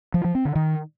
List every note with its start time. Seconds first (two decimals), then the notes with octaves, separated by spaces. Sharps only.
0.14 F3
0.24 F3
0.35 C4
0.45 D3
0.55 D#3